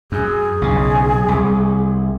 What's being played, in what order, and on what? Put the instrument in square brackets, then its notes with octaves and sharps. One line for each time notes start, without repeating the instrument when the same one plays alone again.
[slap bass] F#2 [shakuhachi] G#4
[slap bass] B1 C#3
C2